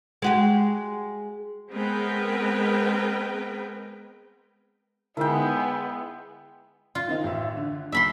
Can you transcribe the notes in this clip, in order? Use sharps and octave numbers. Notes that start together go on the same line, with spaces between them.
G#3 F#4 G4
G#3 B3 C4 A#4 B4 G5
D3 G#3 B3 D#4 E4 G5
F4
D#3 C4 D#4
A1 E5
D3
D#2 E5 B5 C6